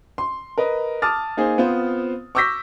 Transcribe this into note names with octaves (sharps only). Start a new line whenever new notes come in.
C6
A#4 B4 D#5
A5 D6 D#6 F6 A6
A#3 D#4 G#4 C5
B3 C4 F4 C5
C#6 D6 E6 G6 A#6 B6